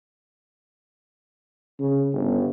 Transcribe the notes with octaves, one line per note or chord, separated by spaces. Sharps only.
C#3
G1